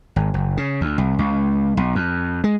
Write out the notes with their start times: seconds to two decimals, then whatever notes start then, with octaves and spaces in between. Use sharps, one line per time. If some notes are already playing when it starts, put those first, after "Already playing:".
0.16 G#1
0.34 F#1
0.57 C#3
0.81 D2
0.98 C2
1.19 C#2
1.77 B1
1.95 F2
2.44 G#3